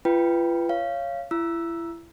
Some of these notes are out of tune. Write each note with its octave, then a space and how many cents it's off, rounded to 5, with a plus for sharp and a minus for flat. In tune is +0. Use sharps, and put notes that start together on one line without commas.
F4 -40 B4 +0 G5 +0
C#5 +0 F5 -15
E4 +30 E6 +0